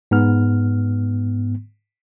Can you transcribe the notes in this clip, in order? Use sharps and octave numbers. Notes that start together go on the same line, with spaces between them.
G#2 B3 F6